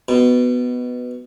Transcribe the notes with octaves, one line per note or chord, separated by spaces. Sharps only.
B2